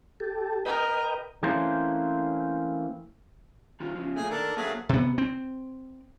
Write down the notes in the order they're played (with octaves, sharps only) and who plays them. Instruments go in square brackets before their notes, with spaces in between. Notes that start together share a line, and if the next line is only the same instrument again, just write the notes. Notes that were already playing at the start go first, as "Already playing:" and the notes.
[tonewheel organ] G4 A4
[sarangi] A#4 [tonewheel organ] B4 D#5 G5
[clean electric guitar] E3 A3 A#3 C4 C#4 C5
[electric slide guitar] D#3 D#4 F4
C#3 F3
[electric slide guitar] A#2 A3 [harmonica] G#4 G#5
[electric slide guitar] D#3 [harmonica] D4 A4 A#4
[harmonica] F#3 A3 G#4 [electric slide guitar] A#3 C4
[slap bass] C3 B3
C4